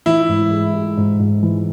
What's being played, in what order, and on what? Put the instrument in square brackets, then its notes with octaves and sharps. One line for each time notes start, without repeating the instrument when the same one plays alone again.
[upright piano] E3 [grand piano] E4
[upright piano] G#2
G#3
G#3
G#2
G#2
E3